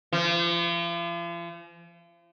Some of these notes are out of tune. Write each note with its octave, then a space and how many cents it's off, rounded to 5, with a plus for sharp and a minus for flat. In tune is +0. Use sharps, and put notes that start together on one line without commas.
F3 -40